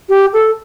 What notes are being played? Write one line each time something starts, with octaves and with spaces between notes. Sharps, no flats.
G4
A4